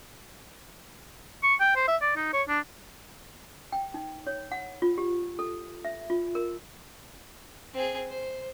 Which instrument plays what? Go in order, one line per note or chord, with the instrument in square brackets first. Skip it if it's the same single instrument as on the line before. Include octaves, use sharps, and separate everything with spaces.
[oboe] C#6
G5
C5
E5
D5
D#4
C#5
D4
[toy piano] G5
D#4
C#5
F#5
F4
G4
A4
E5
F4
A#4
[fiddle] C4 G#4
C5